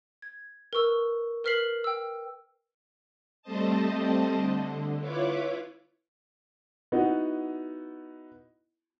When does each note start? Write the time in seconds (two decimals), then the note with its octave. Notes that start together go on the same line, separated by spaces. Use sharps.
0.22 G#6
0.73 A#4 B4 C#6 E6
1.44 A#4 B4 F6 B6 C7 F#7
1.84 G5 E6
3.42 G3 A3 C4 C5 D#5 A5
4.36 D3
4.99 E4 F4 B4 C#5 D6
6.92 B3 D#4 E4 F#4